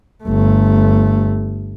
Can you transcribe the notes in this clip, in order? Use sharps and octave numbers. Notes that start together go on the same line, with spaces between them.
G1 A3